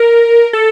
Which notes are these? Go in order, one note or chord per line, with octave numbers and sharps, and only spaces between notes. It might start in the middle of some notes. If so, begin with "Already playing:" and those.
Already playing: A#4
A4